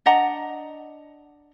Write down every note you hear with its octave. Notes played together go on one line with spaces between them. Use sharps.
D4 D#5 F#5 A#5